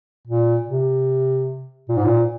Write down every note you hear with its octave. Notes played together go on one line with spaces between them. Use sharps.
A#2
C3
A#2
G#2
A#2